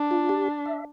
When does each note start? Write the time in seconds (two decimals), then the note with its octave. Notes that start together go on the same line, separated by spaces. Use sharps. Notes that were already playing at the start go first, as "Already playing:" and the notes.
Already playing: D4
0.11 F4
0.29 G4
0.66 E5